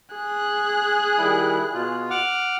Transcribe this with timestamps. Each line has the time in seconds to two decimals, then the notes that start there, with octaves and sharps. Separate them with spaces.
0.15 G#4 F#6
1.18 D#3 G3 E4
1.73 B2 F4
2.10 F#5 D6 F6